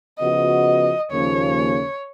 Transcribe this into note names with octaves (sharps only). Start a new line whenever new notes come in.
C#3 F3 B3 F#4 D#5
D#2 C#3 F3 A#3 C#4 C#5